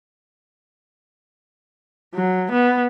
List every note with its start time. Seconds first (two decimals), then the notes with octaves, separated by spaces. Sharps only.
2.15 F#3
2.51 B3